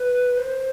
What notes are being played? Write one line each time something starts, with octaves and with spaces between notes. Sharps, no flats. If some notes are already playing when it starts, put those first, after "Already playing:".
Already playing: B4
C5